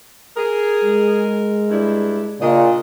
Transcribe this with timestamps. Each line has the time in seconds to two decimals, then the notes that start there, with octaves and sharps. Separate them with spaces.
0.37 G#4 A#4
0.83 G#3
1.70 G2 D4 E4
2.41 A#2 C#3 D4 F4 D#5